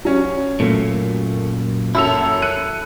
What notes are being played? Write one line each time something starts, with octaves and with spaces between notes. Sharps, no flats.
F#3 C#4
F#2 A#2 A3
F#2 E4 A4 E6 F7
F#6 C#7 D#7